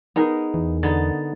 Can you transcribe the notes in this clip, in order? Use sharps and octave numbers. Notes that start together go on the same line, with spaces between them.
B3 D#4 G#4 A#4 D#5
E2
D3 B3 D#4 G#6 A6